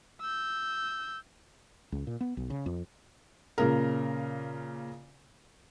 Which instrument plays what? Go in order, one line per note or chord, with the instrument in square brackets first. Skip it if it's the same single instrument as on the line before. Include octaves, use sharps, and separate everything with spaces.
[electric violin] E6 G6
[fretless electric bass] C#2
A#2
B3
B1
C#3
F2
[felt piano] A#2 C#3 A#4